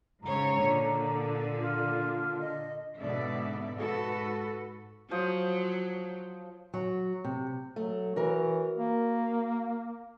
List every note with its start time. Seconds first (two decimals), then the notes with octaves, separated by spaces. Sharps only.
0.23 G#2 C#3 C#5 A#5
0.59 A#2 D3
1.60 F4
2.40 D#5
3.00 G#2 B2 D3 B3 D5 E5
3.76 G#2 F#4 A4 B4
5.11 F3 F#3 C5 D#6
6.74 F#3
7.24 C3
7.76 F#3 A3
8.16 E3 F#4 A#4 C#5
8.78 A#3